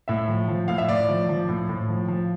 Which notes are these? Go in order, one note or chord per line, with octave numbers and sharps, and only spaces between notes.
A2 E5
F3
F3
A2 F5
E5
A2 D5
F3
F3
A2
A2
F3
F3